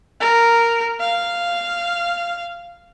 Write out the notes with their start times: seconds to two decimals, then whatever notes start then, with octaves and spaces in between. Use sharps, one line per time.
0.20 A#4
1.00 F5